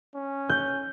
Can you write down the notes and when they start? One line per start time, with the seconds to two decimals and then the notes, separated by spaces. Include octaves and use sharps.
0.14 C#4
0.49 G6